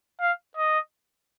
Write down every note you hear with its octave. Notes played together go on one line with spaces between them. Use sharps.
F5
D#5